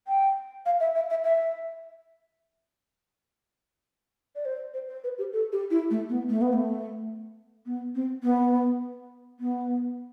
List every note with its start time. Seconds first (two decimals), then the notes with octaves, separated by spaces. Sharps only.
0.08 G5
0.66 F5
0.80 E5
0.95 E5
1.10 E5
1.24 E5
4.35 D5
4.45 C5
4.74 C5
4.88 C5
5.04 B4
5.18 G4
5.33 A4
5.52 G4
5.71 E4
5.91 A3
6.09 B3
6.30 A3
6.42 B3
6.53 A3
7.66 B3
7.95 C4
8.23 B3
9.40 B3